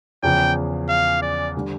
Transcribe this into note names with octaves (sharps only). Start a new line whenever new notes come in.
E2 C#3 F3 G5
F5
D5
D3 G3